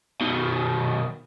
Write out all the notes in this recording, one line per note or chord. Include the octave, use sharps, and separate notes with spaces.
B2 D#3